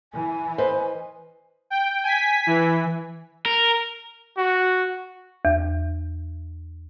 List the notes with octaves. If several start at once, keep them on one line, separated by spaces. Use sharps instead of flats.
E3 G#5
B4 C5 D#5
G5
G#5 B6
E3
A#4
F#4
E2